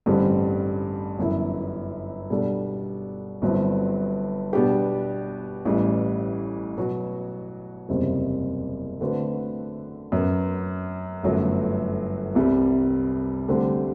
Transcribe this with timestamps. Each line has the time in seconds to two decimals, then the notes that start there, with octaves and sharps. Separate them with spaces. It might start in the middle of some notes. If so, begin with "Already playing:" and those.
0.06 A1 G2 D3 G3 C4
1.18 G1 F#2 E3 B3 E4
2.30 B2 G3 D4 A4 D5
3.42 G1 G2 F#3 C4 E4
4.53 B2 G3 B3 D4 G4
5.65 A1 A2 E3 G3
6.77 B2 F#3 B3 F#4
7.89 F#1 E2 C3 G3 C4
9.00 D3 A3 C4 F#4 B4
10.12 F#2 F#3 B3
11.23 G1 F#2 F#3 A3
12.35 C2 C3 G3
13.48 D2 D3 G3 C4 G4